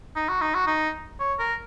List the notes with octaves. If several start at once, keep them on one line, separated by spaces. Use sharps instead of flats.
D#4
F#4
D#4
F#4
D#4
C#5
A#4